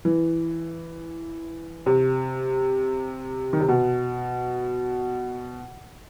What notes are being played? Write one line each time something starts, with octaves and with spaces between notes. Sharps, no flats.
E3
C3
D#3
C3
B2